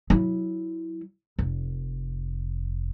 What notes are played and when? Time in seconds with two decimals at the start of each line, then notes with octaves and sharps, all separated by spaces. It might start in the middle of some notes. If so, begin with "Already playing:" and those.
0.10 F#3 E4
1.39 F1